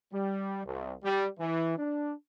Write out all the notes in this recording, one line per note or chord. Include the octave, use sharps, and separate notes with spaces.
G3
C2
G3
E3
D4